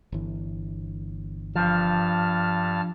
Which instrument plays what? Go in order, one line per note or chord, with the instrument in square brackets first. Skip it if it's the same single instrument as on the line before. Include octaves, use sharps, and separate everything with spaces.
[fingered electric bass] G1 E3
[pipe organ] G2 A5 F6 [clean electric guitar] F3